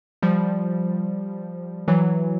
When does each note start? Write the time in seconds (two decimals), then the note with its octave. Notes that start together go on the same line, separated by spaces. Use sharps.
0.22 F3 G3
1.88 E3 F#3